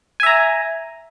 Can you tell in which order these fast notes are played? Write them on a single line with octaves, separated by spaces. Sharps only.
G#5 E5 A#5